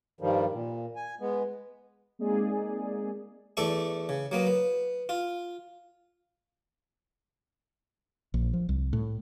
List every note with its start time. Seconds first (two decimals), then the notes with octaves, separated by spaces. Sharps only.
0.21 G2 D#3 F3 G3
0.52 A#2
0.96 G#5
1.20 G#3 B3
2.19 G#3 A#3 C4 D#4 G#4 D5
3.57 E2 A3 A4 D5 C#6
4.09 C#3
4.32 F#3 A#3 B3
4.47 B3
5.09 F4
8.34 A#1
8.53 F3
8.69 C2
8.93 A2